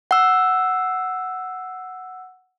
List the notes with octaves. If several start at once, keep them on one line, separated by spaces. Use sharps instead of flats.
F#5 E6